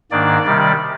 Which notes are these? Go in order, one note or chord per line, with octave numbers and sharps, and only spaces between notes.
G#2 D#3 A#3 D4 D5
C3 D#3 G3